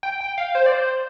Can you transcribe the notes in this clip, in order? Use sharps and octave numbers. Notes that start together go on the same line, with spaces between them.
G5
G5
F5
C5
D5
C5